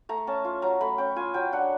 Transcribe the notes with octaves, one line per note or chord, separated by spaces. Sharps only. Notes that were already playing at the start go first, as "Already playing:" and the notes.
A3 A#5
C#4 A5
F4
F#3 A#5
A3 B5
C#4 G5
F4 G#5
F#3 G5
D4 F#5